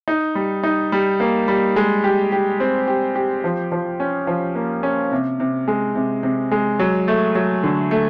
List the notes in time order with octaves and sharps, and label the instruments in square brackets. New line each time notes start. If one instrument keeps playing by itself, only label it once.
[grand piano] D#4
G3
D#4
G3
A#3
G3
G#3
G4
G4
C4
G4
G4
F3
F3
C#4
F3
A#3
C#4
C3
C3
G#3
C3
C3
G#3
F#3
A3
F#3
D3
A3